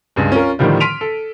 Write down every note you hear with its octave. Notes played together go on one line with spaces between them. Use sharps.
C#2 G2 G#3
C#4 F4 A#4
A2 D3 D#3 F3 G3
C6 F6 B6 D7 D#7 F7
A4